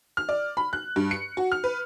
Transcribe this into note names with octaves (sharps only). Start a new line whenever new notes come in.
F6
D5
B5
F#6
G2
C#7
F#4
F6
B4